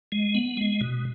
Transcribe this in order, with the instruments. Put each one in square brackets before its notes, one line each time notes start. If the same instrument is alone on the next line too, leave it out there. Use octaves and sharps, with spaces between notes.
[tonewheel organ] G#3
B3
G#3
B2